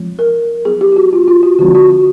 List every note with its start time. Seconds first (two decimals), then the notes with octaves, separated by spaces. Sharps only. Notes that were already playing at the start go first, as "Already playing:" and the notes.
Already playing: F3 G#3 C4 F4
0.19 A#4
0.65 F#3 B3 E4 G#4
0.81 G4
0.92 G4
0.96 F#4
1.13 F4
1.28 F4
1.43 F#4
1.59 D3 F3 G#3 C4 D#4 F#4
1.75 F#4
1.90 F#4